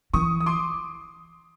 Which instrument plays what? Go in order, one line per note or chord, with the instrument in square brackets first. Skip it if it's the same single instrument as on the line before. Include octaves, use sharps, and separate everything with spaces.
[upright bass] E3 [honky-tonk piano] C#6 D#6
[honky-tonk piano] D#6
C6 D6